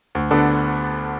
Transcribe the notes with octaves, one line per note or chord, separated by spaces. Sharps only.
D2
D3 B3 D4 A4